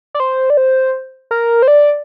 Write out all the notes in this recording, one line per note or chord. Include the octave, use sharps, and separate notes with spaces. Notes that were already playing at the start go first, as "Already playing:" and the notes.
D5
C5
D5
C5
A#4
C5
D5